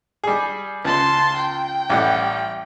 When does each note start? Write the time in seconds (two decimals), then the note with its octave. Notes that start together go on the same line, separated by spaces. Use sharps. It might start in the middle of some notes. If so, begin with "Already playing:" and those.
0.24 G3 G#4
0.85 C#2 A5 C6
1.36 G5
1.90 A1 G3 F#5